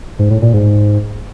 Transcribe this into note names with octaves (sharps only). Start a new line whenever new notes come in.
G#2
A2
A#2
G#2